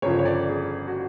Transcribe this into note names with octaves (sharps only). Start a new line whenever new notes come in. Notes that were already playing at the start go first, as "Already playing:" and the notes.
G1 F2 C#3 F3 C#5
C#5
D5
G#4
F#4